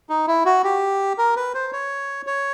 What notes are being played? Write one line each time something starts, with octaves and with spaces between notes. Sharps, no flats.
D#4
E4
F#4
G4
A#4
B4
C5
C#5
C#5